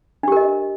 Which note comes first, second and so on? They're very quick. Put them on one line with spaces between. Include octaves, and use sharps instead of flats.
D4 G4 A#4 D#5